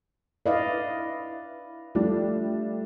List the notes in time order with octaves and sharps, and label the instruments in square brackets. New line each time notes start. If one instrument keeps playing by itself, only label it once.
[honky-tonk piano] E4 B4 [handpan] D5 D#5 F5
[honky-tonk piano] F3 G3 D4 [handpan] A3